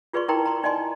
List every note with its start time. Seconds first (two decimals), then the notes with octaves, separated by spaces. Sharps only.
0.13 F4 G#4 B4 D5 C6 C#6
0.28 D#4 E4 A#4 G5 A#5 C6
0.46 A#5 C6
0.64 D#4 D5 D#5 G#5 C6